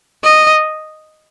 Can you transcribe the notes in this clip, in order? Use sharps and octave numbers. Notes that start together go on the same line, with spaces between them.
D#5